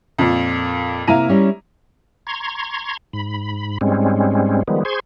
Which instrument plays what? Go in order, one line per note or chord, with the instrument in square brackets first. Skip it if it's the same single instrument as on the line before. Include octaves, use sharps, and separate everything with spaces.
[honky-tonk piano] F2 A#2
[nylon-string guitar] C3 A#3 F5 [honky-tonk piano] E4 A#5 D#7
[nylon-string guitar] G3 C#4
[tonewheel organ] A#5 C6 C#6 G#6
G#2 B5
G#2 G3 G#3 C4 C#4
D#3 F3 G3 G#3 B3
G#4 C5 C6 C#6 G#6